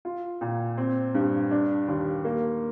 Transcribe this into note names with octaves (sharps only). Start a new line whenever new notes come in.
F4
A#2
C4
G2
D4
D#2
A#3